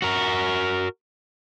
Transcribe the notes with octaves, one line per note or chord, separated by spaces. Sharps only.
F#4 A#4